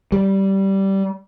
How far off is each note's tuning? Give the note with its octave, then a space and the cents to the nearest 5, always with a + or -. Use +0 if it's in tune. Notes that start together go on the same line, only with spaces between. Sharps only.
G3 -15